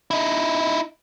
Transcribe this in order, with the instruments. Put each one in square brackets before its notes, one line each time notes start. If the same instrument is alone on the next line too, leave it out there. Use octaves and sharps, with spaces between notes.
[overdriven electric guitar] D#4 E4